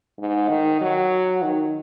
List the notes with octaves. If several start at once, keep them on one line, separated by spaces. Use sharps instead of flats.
G#2
D#3
F#3
D#3